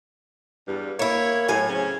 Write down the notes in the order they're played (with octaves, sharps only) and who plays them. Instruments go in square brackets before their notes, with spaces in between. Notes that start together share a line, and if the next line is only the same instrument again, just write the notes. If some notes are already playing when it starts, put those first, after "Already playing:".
[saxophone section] E2 G2
[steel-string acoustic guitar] A#3 E4 [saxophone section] C#5
[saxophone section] A2 [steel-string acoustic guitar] F#3 G#5
[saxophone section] C#3 C4 C#4